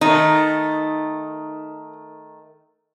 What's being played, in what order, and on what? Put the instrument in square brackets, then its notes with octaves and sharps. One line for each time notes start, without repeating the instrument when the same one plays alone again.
[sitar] D#3 A3 [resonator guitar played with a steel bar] D#4